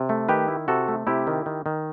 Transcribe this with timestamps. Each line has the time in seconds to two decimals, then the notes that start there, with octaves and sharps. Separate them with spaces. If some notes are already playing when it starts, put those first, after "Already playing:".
Already playing: C3
0.09 A3
0.29 D#3 G4 B4
0.48 E4
0.68 C3 F#4 A4
0.88 A3
1.07 C3 E4 G4
1.27 D#3
1.46 D#3
1.66 D#3